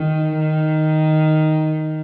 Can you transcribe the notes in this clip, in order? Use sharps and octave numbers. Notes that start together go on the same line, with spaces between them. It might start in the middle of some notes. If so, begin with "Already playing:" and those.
Already playing: D#3
D#3